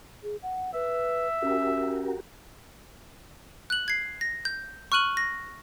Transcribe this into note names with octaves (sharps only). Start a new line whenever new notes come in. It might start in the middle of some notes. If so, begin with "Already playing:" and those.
G#4
F#5
B4 E5
C#4 F#4 G4 A#4
F#6 F#7
G#6 C7
A#6
G6
C#6 F6 F#6 D#7 F#7
A#6